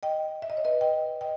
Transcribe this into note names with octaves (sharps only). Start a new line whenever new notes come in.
D#5 G5
E5
D#5
C#5
B4 D#5
D#5 G5
D#5 G5